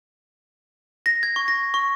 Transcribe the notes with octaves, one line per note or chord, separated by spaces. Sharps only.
A#6
G#6
C#6
A#6
C#6